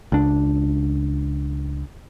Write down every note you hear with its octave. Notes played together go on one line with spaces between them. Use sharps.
C#2 D4